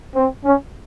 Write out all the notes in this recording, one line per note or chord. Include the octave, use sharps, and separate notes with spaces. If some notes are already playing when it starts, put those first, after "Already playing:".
C4
C#4